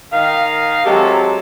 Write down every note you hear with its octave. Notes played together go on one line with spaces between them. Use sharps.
D#3 F5
C3 F#3 G#3 G4 A4